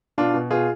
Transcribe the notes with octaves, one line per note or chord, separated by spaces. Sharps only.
B2 D4 F4
B2
B2 F4 G#4